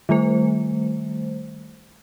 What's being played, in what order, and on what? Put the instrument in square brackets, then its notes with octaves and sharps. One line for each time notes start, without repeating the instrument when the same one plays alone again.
[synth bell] D#3 G3 A3 C5